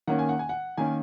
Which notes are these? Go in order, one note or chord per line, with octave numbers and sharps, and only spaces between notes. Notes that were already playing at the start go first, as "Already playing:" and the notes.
D#3 A#3 C#4 F#5
G#5
F#5
G#5
F#5
D#3 A#3 C#4 G#5